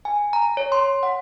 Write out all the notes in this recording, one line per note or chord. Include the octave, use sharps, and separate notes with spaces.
G#5
A#5
C#5
C6
F#5